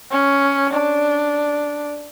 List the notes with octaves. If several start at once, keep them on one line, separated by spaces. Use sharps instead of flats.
C#4
D4